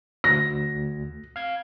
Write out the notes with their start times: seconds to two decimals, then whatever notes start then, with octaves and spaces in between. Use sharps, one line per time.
0.24 D2 A#6
1.36 F5 G#6